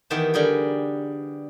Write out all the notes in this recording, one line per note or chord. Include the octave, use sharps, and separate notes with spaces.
D#3 E3 B3 G4 A5
D3 G3 G4 G#4 A#4